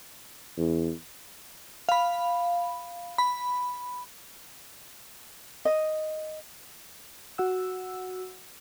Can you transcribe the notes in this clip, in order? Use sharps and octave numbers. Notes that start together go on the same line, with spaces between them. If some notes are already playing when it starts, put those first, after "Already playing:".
E2
F5 B5
B5
D#5
F#4 F#5 E6